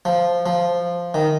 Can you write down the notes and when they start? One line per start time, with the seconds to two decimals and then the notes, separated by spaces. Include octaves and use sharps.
0.05 F3
0.46 F3
1.14 D#3